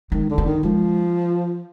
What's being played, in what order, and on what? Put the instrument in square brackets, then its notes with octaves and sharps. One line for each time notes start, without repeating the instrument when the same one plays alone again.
[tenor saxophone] D#3 [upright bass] G#3
[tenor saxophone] D3
[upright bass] B3
[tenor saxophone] D#3
[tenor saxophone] F3 [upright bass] G#3